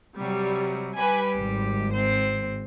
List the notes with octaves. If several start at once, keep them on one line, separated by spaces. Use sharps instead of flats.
C3 F#3 G3
G3 G4 B4 G#5
G#1
C4 C5